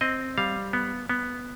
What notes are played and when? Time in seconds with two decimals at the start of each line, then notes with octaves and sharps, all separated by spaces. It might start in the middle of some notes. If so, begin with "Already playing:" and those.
0.01 C4 D#5
0.38 G3 F5
0.73 B3
1.09 B3